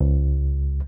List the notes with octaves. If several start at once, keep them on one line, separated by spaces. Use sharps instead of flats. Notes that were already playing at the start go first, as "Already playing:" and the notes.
C#2